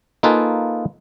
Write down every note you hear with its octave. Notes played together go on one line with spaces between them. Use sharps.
A#3 D#4 F4 A4 B4 G#5